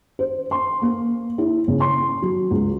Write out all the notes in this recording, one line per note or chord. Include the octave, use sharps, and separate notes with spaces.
C5
C6
A#3
E4
C#3
C6
F#3
C#2